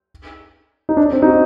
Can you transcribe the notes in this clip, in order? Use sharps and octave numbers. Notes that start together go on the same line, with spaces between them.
D#4
D4
C4
D#4
F#4